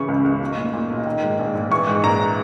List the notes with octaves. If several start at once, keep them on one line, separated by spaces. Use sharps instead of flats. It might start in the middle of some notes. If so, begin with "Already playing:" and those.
Already playing: C#3 E3 C#6
C#2
C#2
B1
A#2
A#2
B1
D#3
G#2
A#1
A#1
E3 C#6
G#2
A#1 A#5